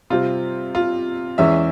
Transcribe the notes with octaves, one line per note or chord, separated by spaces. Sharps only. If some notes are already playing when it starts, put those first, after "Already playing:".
C3 G3 C4 F4
F4
E2 E3 G#3 C#4 E5